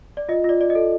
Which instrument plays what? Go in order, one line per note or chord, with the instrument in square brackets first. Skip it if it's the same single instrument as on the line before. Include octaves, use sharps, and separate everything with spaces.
[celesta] D5
F4 D#5
F4 D5
D5
D#5
A4